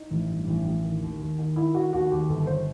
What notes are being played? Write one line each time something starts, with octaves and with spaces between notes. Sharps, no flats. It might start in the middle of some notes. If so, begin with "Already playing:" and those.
Already playing: D#4
A1
G2
A1
A1
D#3
D#2
D#2
D#3
D#3 E4
D#3 F#4
D#2 F#4
D#2 G4
G1 A4
G1 C5